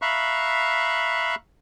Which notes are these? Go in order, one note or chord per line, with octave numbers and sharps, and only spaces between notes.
E5 F5 A#5 B5 C#6 F#6